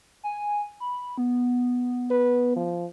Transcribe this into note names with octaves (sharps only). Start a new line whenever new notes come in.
G#5
B5
B3
B4
F3